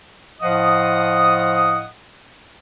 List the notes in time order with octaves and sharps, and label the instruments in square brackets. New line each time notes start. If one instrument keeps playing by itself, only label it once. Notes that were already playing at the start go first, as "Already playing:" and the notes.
[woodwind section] A2 F3 D#5 F5 F#5 D#6